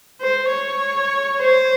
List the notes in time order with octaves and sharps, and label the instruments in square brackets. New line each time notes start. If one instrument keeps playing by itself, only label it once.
[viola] C5
C#5
C5